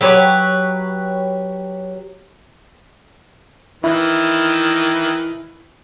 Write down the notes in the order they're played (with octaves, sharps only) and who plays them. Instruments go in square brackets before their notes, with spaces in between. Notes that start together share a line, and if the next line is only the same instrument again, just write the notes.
[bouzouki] F#3 G4 B4 C#5
[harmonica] D#3 E3 B4 [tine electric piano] E4